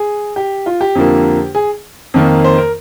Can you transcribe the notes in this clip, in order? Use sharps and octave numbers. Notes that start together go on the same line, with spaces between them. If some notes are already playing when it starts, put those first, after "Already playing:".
Already playing: G#4
G4
F4
G4
F2 D3 F3 A#3
G#4
F2 D#3 A#3
C5
A#4